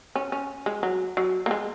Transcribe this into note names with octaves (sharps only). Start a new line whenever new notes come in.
C#4
C#4
G#3
F#3
F#3
A#3
G#3